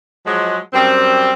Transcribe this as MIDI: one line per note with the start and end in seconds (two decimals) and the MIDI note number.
0.26 0.58 53
0.26 0.58 54
0.26 0.58 56
0.73 1.32 42
0.73 1.32 55
0.73 1.32 60